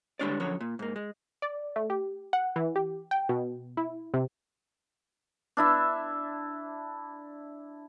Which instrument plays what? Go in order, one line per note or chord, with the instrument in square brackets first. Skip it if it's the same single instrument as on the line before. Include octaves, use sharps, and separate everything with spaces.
[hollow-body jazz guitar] D3 G3 G#3 D4 C#5 D5
F#2 D3 F3 F#3 C#5
A#2
G#2 A#3
G#3
[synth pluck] D5
A3
G4
F#5
E3
G4
G5
B2
E4
C3
[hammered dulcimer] D4 E4 E5